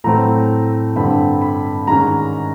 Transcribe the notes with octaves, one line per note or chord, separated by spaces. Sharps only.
A2 F#3 A3 C4 A#5
G2 D3 G3 C4 B5
B5
G#2 D#3 G#3 C#4 A#5